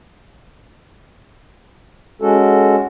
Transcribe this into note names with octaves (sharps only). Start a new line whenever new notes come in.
G#3 C#4 F#4 A4